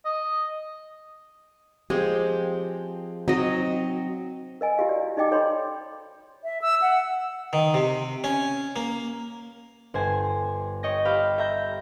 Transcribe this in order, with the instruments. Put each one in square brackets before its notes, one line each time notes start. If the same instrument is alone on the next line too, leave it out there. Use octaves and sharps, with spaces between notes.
[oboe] D#5
[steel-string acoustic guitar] F3 C4 G4 [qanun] G#3
[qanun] F#3 D#5 [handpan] C4 [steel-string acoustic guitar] D#4
[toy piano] A#4 D#5 G#5
E4 F#4 G4 F5
D5
D#4 G4 D#5 G5 D6
A4 C#5 B5 C6
[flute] E5
E6
F#5
[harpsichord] D#3
C3
C#4
A#3
[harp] G1 C5 G#5
C#5 D#5 G5 A#6
G4 C5 F5 B5
E5 A#5 G6